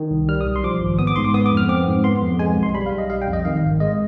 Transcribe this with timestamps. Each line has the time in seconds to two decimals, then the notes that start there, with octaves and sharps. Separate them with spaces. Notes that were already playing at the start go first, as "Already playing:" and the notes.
Already playing: D#3
0.11 C2
0.29 G3 F6
0.41 D#6
0.46 B1
0.56 C6
0.64 F3 D6
0.81 G#1
0.99 B3 D#6
1.07 D6
1.16 G#2 C6
1.25 D6
1.34 B3 D#6
1.46 D6
1.51 F2
1.57 F6
1.69 C4 D6
1.87 G#2
2.04 B3 C6
2.22 F2
2.39 G#3 G#5
2.57 B1
2.63 C6
2.74 G3 B5
2.86 F5
2.92 B1
2.98 D#5
3.10 G3 F5
3.22 G5
3.27 F2
3.33 D#5
3.45 D#3 F5
3.63 G#1
3.80 G#3 D#5